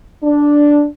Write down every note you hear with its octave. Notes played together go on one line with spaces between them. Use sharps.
D4